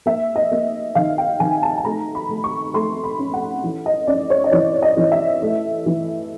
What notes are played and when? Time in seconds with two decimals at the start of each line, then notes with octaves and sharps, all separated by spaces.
0.06 A#3 E5
0.36 D#5
0.51 A#3
0.95 D#3 F5
1.18 G5
1.40 D#3 G#5
1.63 A5
1.77 A5
1.85 A3 A#5
2.15 B5
2.29 A3
2.44 C#6
2.74 A3 C6
3.04 B5
3.19 C#4
3.34 F#5
3.63 E3
3.86 D#5
4.07 C#4 D5
4.30 C#5
4.44 D#5
4.52 E3 D5
4.82 D#5
4.97 E3
5.12 E5
5.42 A3
5.86 E3